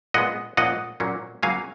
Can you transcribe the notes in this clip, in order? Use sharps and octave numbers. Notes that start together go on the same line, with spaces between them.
A#2 G#3 B3 D#5 F#5
A#2 F3 A#3 C#4 D#5 F#5
A#2 F#3 A#3 C#4
C#3 F#3 A#3 C#4 F5 G#5